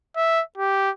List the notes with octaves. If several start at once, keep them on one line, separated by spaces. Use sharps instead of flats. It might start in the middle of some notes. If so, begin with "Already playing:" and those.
E5
G4